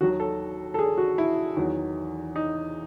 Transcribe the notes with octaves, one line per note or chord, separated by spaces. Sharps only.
D#2 D#3 F#3 F#4
A4
A4
G#4
F#4
E4
E2 D#3 F#3
D#4